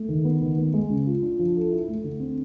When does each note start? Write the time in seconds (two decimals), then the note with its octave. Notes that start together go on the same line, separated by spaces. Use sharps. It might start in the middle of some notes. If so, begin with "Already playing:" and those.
Already playing: A3
0.09 D#3
0.25 B3
0.41 D#3
0.57 B3
0.74 G#3
0.90 C#3
1.06 F4
1.23 D4
1.39 F3
1.56 A4
1.71 E4
1.89 A3
2.04 D3
2.20 C4